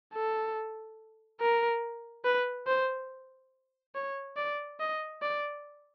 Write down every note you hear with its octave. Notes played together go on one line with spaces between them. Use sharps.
A4
A#4
B4
C5
C#5
D5
D#5
D5